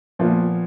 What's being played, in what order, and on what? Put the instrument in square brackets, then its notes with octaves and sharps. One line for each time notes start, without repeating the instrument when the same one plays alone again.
[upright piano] A#2 F3 B3 F4